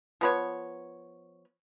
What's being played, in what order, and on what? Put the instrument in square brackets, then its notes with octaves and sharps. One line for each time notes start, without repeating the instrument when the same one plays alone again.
[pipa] F3 B3 C#5